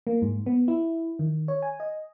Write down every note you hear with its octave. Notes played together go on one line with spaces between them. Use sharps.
A#3
G#2
B3
E4
D#3
C#5
G#5
D#5